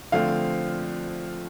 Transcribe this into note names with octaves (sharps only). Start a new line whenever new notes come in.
D3 F3 A3 C4 F5